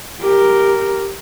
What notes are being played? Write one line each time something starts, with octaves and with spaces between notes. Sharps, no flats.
G4 A#4